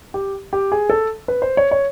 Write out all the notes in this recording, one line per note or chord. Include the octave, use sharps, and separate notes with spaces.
G4
G4
G#4
A4
B4
C5
C#5
C#5